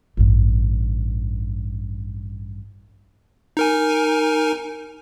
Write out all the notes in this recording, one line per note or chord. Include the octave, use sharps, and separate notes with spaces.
A1 G2
D#4 A#4 G#5